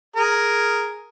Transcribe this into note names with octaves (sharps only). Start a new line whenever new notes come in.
G#4 A#4